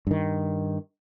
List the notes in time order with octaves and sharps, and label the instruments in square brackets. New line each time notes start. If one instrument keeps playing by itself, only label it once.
[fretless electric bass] G2 D#3